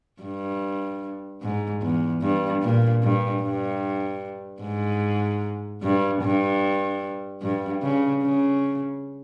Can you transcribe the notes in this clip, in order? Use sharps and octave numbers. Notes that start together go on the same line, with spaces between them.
G2
G#2
E2
G2
A#2
G2
G2
G#2
G2
G2
G2
C#3
C#3